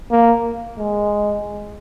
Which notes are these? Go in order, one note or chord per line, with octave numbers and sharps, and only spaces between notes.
A#3
G#3